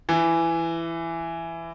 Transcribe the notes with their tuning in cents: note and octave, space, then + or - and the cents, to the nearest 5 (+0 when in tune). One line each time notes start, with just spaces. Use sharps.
E3 +15